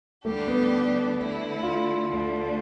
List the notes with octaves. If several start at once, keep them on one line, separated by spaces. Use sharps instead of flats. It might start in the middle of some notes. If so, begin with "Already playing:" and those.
D2 D3 G3 A3 D4 G4
B3
D3 A3 E4
F4
D2 D3 A3